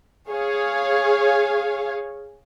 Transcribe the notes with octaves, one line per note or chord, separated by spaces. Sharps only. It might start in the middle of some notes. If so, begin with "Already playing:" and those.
G#4 C#5 F5